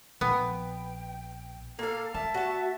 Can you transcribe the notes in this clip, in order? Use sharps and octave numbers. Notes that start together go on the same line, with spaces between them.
A#1 B3 G5
A#3 A4 F5
A3 E5 A5
F#4 A5